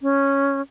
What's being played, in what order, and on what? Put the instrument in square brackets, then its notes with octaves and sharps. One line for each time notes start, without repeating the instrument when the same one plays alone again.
[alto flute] C#4